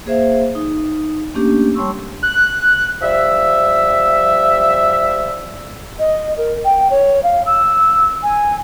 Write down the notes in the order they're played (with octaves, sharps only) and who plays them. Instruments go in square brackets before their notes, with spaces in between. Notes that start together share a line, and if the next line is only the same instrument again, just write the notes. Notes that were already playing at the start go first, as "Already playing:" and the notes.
[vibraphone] A#3 G#4 C5 E5 F5
D#4
A3 A#3 C#4 D4 G4
G3 C#5 A5 C6 C#6 E6
[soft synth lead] F#6
[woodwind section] F3 G3 E5
[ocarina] D#5
A#4
G5
C#5
F5
E6
G#5